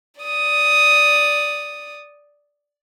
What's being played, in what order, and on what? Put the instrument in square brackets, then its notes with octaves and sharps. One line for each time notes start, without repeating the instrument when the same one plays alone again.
[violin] D5 D#6